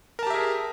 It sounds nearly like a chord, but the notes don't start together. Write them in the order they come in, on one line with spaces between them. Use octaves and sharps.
A#4 A5 G4 E5 G#4